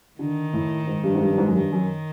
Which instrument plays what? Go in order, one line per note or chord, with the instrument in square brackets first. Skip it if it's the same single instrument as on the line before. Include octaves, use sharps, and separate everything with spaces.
[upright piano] D3 [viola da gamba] D#3
[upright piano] A2
G#2
G2
G#2
G2
G2
G#2
F#2
[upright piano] G2 [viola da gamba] D#3
[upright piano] F#2